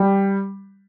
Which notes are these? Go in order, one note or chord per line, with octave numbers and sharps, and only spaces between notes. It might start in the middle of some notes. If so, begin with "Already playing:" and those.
Already playing: G3